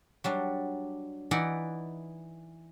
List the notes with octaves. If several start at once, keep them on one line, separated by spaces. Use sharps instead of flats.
F#3 G3 D4
E3 D#4 E4 D5 F#5